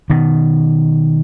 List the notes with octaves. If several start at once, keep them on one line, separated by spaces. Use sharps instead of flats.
B2 D#3